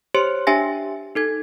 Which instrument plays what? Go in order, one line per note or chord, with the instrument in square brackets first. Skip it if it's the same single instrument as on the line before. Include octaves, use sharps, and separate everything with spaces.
[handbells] G4 C5 C#5 C6 C#7
D4 G4 E5 G#5 A#6
D#4 A4 G#6